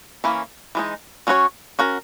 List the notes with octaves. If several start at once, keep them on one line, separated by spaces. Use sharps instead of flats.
E3 A#3 C#4 E4
E3 G#3 D#4
F#3 C#4 F#4 C#5
C#4 F#4 A#4